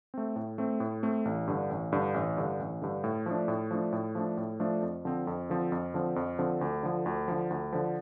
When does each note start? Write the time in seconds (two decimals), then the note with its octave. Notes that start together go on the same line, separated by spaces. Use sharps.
0.14 A3 C4
0.36 A2
0.58 A3 C4
0.80 A2
1.03 A3 C4
1.25 A1
1.47 G2 D3
1.69 A1
1.92 G2 D3
2.14 A1
2.37 G2 D3
2.59 A1
2.82 G2 D3
3.04 A2
3.26 F3 A3 D4
3.48 A2
3.71 F3 A3 D4
3.93 A2
4.15 F3 A3 D4
4.37 A2
4.60 F3 A3 D4
4.82 F2
5.05 D3 F3 C4
5.27 F2
5.49 D3 F3 C4
5.72 F2
5.94 D3 F3 C4
6.16 F2
6.39 D3 F3 C4
6.61 D2
6.83 D3 F3
7.06 D2
7.28 D3 F3
7.50 D2
7.73 D3 F3